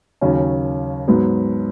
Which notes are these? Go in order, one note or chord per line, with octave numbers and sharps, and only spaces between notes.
D#2 C#3 F#3 C#4
G#2 F#3 B3